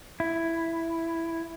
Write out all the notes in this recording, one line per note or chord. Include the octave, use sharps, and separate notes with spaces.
E4